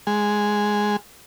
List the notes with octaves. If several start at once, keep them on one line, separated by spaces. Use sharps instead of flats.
G#3